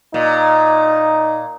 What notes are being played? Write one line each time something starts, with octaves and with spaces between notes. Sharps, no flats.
A#2 D#4